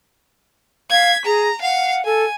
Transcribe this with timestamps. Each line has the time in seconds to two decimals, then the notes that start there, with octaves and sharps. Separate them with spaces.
0.91 F5 G#6 B6
1.25 G#4 A#5
1.62 F5 F#5
2.06 A4 G#5